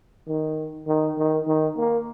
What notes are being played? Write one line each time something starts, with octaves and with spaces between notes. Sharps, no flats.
D#3
D#3
D#3
D#3
A#3